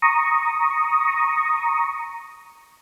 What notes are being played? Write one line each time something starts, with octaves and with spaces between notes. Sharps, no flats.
A#5 C#6 D#6